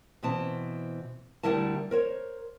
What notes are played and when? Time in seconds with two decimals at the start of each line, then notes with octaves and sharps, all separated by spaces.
0.23 B2 E3 C4 A5
1.43 D2 D3 G3 E4 A#4 A5
1.91 A#4 C5 C#5